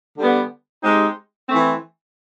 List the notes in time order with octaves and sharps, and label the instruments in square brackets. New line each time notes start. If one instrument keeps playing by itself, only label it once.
[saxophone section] D3 G3 B3
G#3 C4 D#4 G4
E3 A3 C4